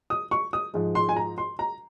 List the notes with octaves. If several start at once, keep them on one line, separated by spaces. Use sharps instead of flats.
D#6
C#6
D#6
G#2 F3 G#3
C6
G#5
A#5
C6
A#5